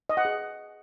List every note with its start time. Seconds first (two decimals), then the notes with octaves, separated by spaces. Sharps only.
0.09 D#5
0.17 F#5
0.25 G#4